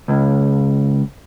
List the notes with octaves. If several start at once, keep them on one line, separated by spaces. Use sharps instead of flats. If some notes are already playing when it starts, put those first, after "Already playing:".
C#2